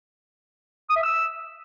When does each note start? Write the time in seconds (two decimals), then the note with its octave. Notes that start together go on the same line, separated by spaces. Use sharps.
0.89 D#6
0.96 E5
1.03 E6